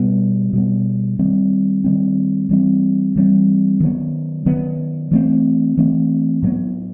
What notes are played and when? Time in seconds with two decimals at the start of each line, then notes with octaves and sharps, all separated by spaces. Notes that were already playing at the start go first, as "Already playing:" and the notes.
Already playing: B2 G3 B3
0.53 B2 G3 B3
1.19 D#3 G3 C4
1.84 D#3 G3 C4
2.49 E3 G3 C4
3.16 E3 G3 C4
3.80 D#3 F#3 B3
4.46 D#3 F#3 B3
5.12 E3 A3 C4
5.77 E3 A3 C4
6.42 A2 F#3 B3